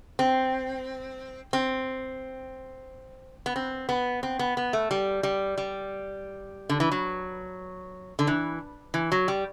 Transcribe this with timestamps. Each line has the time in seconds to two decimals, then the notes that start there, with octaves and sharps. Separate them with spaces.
0.19 C4
1.53 C4
3.46 B3
3.56 C4
3.89 B3
4.23 C4
4.39 B3
4.57 B3
4.73 A3
4.91 G3
5.23 G3
5.58 G3
6.69 D3
6.80 E3
6.92 F#3
8.19 D3
8.27 E3
8.94 E3
9.12 F#3
9.28 G3